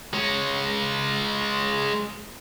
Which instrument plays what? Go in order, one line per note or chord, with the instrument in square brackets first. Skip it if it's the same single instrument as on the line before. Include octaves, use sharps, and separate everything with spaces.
[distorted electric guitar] G#3 C#5